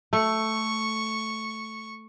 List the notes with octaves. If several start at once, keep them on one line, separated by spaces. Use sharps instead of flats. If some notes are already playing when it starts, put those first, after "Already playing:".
A3 C#6